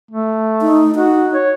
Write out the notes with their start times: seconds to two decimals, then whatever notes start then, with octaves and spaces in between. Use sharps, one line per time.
0.11 A3
0.61 D#4
0.95 D#4 F#4
1.34 C#5